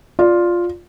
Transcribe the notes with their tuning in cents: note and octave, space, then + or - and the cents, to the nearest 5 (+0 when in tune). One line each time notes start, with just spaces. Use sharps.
F4 +5 D5 +0